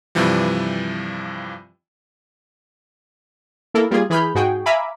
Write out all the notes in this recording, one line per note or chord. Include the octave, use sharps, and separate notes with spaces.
G2 C3 E3 F3 G3
A#3 E4 A4 A#4
G3 A#3 F4 G#4
E3 G#4 B5 F6 G6
G#2 F#4 G#4 G5
E5 F5 G#5 A#5 B5 D6